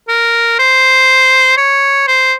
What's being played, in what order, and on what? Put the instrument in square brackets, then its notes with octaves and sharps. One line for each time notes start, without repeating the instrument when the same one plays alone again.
[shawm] A#4
C5
C#5
C5